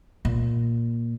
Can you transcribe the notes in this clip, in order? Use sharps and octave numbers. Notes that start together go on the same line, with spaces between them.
A#2